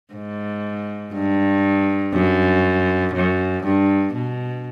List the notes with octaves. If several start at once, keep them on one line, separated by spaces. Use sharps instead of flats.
G#2
G2
F#2
F#2
G2
B2